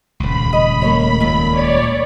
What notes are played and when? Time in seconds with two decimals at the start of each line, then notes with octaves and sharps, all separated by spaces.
0.20 D#1 C#2 B5
0.53 D#5
0.82 A3 A#3 C#5
1.20 D#2 A#2
1.51 C#5 D5